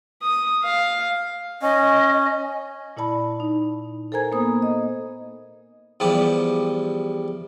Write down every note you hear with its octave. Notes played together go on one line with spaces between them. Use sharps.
D#6
F5
C#4 D#5
A#2 E4 D5 A5 B5
D#4
A4 A#4 C5 G#5 A#5 G#6
A#3 B3 C5 D#6
D#5
E2 F3 G3 G4